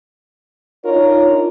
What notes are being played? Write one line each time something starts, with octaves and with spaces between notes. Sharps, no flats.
D4 D#4 F4 A#4 C#5